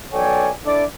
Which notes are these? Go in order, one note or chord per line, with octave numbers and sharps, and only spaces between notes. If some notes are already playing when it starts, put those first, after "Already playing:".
B1 A4 C#5 D5 G5 G#5
D4 E4 A4 D5